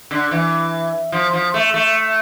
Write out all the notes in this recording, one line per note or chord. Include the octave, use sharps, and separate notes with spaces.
D3
E3
F3
F3
A3
A3